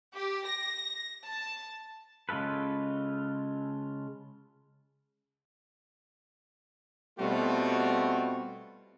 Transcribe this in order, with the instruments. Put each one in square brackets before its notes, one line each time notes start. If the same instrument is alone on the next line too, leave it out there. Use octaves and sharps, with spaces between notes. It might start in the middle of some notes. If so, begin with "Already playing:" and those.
[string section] G4
A#6
A5
[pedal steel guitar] C#3 G#3 F4 A4 B4
[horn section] B2 G3 A3 C4 F4 F#4